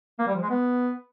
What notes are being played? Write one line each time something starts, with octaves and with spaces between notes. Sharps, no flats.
A#3
G3
F3
G#3
B3